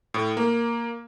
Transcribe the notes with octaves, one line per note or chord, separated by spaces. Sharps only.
A2
A#3